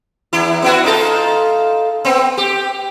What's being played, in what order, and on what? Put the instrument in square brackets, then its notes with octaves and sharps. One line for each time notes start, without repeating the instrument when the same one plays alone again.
[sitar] E2 E4
B3 E4 F#4
D#4 F4 A4
B3 C4
G4